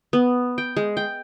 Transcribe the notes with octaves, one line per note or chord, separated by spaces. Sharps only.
B3
G5
G#3
G5